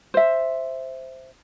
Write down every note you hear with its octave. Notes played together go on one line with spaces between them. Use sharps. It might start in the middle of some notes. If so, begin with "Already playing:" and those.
C5 E5